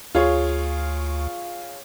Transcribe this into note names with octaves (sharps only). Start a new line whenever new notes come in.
D2 F4 G#4 C#5